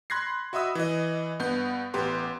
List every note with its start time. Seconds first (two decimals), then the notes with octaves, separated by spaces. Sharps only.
0.10 B5 C6 F#6 G#6 A#6 C7
0.53 F#4 D#5 E5 B5 D#6 E6
0.75 E3 D#5
1.39 G2 B3 G6
1.94 A1 B3 G4 B4 C6